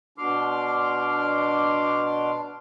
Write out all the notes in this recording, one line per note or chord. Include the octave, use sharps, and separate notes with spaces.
B2 D4 C6 D6 F6